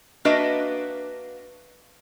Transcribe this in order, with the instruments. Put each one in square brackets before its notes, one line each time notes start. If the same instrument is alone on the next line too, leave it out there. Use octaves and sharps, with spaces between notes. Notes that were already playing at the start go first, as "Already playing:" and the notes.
[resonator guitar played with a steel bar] A#3 D4 F#4 B4 D#5 E5